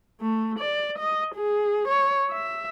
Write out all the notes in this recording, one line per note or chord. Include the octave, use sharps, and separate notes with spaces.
A3
D5
D#5
G#4
C#5
E5